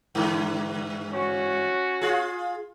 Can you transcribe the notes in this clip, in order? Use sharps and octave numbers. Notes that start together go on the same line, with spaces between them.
G2 D3 E3
C#4 F#4
F4 G#4